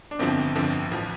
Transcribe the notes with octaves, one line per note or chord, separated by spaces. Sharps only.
D4
G1 F2 D3 F3 C4
G1 F2 D3 F3
A1 F3